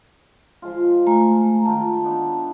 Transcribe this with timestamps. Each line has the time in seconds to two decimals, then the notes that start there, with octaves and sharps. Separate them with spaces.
0.62 F3 G#3 F4
1.07 A3 G#5 A#5
1.65 D#3 F4 G5 A5
2.04 B3 D4 D#4